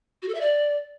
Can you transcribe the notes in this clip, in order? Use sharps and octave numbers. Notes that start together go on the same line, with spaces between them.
F#4
A4
E5
D5